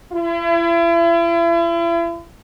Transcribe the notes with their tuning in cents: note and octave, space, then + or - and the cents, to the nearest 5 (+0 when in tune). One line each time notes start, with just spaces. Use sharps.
E4 +40